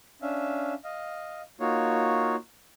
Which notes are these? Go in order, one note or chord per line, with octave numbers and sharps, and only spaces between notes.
C#4 D4 E5 F5
D#5 F5
A#3 D#4 F4 F#4 C#5